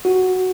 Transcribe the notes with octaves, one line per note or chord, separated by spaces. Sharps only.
F#4